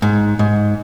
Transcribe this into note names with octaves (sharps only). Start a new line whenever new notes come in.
G#2
G#2